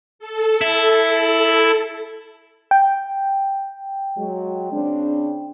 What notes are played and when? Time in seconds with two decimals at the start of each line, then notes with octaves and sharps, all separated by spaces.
0.19 A4
0.61 E4
1.05 A4
2.71 G5
4.17 F#3 G#3
4.72 C#3 C4 D4